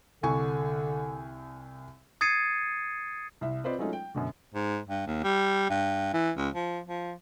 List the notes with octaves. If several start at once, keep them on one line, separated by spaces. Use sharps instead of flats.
C2 D3 G#5 C#6
D#6 G#6 A6 C7 C#7 D#7
C2 E5
C4 F4 B4 C5 D5 D#5
F#3 G#3 A3 C#4 D#4 F4
G5
F#2 B2 D3
G#2
G2
D#2
G3
G2
E3
C#2
F3
F3